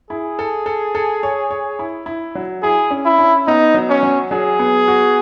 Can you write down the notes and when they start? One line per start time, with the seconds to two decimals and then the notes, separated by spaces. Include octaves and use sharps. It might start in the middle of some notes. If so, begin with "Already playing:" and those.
0.10 E4 G#4
0.39 A4
0.66 A4
0.95 A4
1.23 C#5
1.51 C#5
1.79 E4
2.06 E4
2.35 F#3
2.63 E4 G#4
2.91 C#4
3.05 E4
3.19 C#4
3.47 B3 D#4
3.74 F#3
3.89 C#4
4.03 F#3
4.31 F#3 G#4
4.59 B3
4.88 F#4